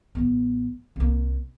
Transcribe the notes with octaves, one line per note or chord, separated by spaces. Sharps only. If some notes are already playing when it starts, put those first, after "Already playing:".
A1 B3
C2 A#3